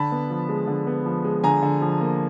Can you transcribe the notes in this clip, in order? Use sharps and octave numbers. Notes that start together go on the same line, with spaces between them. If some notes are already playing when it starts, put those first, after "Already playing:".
Already playing: D3 A5 B5
B3
F3
G#3
D3
B3
F3
G#3
D3 G#5 A#5
D3
F3
A#3